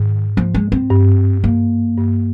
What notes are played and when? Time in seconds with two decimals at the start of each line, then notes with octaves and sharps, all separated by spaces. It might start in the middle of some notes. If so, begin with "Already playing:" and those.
Already playing: G#2 D#3
0.37 F3
0.54 G#3
0.72 C4
0.90 G2
1.44 A#3
1.97 G2